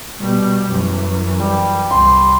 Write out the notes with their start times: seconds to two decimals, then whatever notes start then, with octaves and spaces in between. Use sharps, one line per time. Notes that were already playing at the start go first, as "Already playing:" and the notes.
0.19 B2 G3
0.70 F#2 E3
1.40 G3
1.91 C2 C6